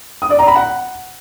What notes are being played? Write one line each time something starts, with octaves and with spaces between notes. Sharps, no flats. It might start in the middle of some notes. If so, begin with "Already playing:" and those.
D#6
D5
A#5
B5
F#5